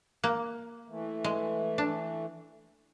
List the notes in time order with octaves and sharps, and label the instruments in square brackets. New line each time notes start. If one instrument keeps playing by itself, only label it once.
[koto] A#3
[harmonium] E3 A3
[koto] G#3
D4